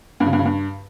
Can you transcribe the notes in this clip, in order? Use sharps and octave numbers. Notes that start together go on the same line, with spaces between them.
G2
C#3
G2
C#3
G2